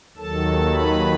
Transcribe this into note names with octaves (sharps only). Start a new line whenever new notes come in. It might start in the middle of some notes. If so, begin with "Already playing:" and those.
D#2 D#3 F#3 A4 A5
B4 B5